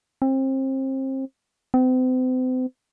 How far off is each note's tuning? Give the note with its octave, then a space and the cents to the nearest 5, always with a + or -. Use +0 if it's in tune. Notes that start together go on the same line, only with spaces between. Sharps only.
C4 +30
C4 -40